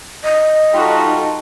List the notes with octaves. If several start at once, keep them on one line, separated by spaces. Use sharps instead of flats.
D#5
G3 D#4 F4 F#4 A4